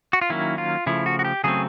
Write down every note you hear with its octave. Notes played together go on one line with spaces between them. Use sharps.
F#4
F4
D#3 F#3 A#3 C#4 E4
F4
C#3 F3 A3 E4
F#4
F#4
G4
C#3 F#3 A3 C4 G#4